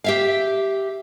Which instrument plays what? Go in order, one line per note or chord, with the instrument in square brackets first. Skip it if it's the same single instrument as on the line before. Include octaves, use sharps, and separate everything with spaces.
[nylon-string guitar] G4 E5 F5